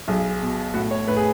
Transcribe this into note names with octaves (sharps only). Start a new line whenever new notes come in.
B1 G#4
B2
A2 F#4
C#5
A2 B4
G#4